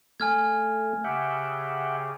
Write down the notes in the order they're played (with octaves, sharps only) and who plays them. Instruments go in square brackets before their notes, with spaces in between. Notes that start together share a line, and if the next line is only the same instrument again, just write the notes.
[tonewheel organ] A3 [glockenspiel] G#5 F6 G#6
[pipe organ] C#3 G4 G#4 [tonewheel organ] E5 F#5 G5